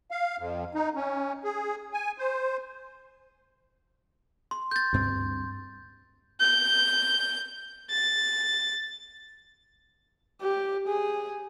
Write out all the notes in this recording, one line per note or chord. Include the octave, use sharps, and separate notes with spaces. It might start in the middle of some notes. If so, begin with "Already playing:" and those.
F5
F2
D#4
C#4
G#4
G#5
C5
C6
G6 A6
D2 G2 C4
G6
A6
G4
G#4